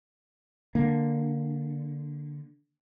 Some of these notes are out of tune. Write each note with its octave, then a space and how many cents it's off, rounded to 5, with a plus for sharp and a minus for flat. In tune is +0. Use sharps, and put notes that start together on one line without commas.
D3 +0 A#3 +0